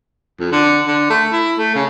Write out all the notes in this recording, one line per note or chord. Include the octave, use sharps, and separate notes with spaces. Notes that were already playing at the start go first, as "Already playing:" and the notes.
F2
D3
D3
A3
E4
A3
C#3